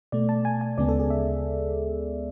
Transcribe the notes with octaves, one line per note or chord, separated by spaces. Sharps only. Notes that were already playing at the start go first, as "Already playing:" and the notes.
B2 A3 D5
A5
G#5
G#5
D2 C#3 G#3 B3 D5
A4
G#4
E5